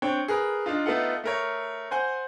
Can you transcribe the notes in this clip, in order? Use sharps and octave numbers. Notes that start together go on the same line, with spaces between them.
C4 D4 C#5 G5
G#4 A#4 B4
D4 D#4 F4
A3 B3 D#4 F4 A4 F#5
A3 A#4 C#5
C5 F#5 G#5 G6